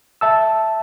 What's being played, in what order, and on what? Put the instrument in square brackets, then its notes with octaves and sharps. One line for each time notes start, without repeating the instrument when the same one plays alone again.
[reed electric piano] E5 A5 E6